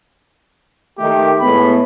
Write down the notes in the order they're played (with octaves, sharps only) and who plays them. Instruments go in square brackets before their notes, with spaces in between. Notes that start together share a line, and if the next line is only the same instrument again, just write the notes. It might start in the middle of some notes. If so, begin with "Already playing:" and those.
[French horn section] D#3 A3 [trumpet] G4
[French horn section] A2 G#3 B3 [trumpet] B5